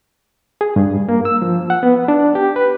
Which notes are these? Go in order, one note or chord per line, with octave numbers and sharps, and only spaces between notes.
G#4
G2
A#3
E6
F3
F#5
B3
D4
G4
B4